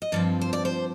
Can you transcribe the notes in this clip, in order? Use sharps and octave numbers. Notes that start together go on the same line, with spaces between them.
D#5
G2 F3 C4 D5
C5
D5
C5